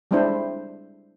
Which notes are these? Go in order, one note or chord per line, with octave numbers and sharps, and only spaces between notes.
G3 G#3 C4 D4 E4 C5